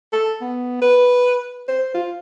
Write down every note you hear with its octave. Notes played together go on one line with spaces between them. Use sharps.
A4
B3
B4
C5
F4